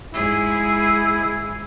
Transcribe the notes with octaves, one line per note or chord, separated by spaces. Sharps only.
G#2 E4 G#4